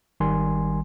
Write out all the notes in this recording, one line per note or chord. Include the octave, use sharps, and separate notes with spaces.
G#1 D#3 G3 G#5 C6